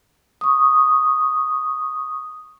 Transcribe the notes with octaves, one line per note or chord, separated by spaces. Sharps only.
C#6 D#6